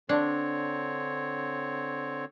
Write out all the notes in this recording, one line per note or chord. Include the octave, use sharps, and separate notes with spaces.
D3 C4 D4 C#5